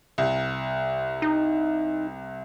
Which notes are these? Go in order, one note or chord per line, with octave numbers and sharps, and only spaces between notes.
C2
D#4